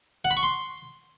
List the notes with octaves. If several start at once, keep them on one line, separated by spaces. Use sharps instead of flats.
F#5
B5
C#6
C6